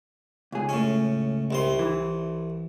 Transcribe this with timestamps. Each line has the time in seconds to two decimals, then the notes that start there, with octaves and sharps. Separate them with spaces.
0.52 C#2 G#4
0.69 A2 C#4
1.51 C2 C3 C6
1.79 E3